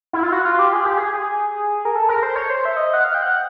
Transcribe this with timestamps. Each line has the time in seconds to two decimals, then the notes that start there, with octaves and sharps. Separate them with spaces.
0.13 E4
0.23 F4
0.32 F#4
0.45 F4
0.59 G4
0.73 G#4
0.85 G4
0.97 G#4
1.85 A#4
1.95 A4
2.09 A#4
2.23 C5
2.36 C#5
2.50 C5
2.65 E5
2.77 D#5
2.94 F#5
3.04 F5
3.14 G5
3.22 F#5